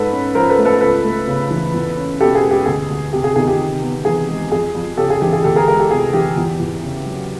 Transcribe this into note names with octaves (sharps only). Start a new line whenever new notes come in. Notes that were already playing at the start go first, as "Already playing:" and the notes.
Already playing: G#2 A4 B4
C#4
F3 A#4 C5
A4 B4
A3
A4 B4
C#2 A4 B4
A3
C#3
E3
E2
C#4
B2 G4 A4
G#4
G#3
G4
D2 G#4
D2
C3 G4
G#4
D#3 G#4
G4
C3
B3
E3 G#4
G#3
F2 G#4
F2
C#3 G4 A4
G#4
E3 G4
G#4
D2 G4 A4
G#4 A#4
G#3 G#4 A#4
G4 A4
C3 G#4
E3 G4
E2
E2
C#3
F#3